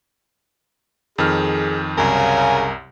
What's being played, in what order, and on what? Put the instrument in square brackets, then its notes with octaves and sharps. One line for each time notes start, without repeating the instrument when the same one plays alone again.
[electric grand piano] F2 D#3 F6 [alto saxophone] G#4
[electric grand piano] C2 F#2 [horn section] C#3 [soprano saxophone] A#4 [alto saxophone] G#5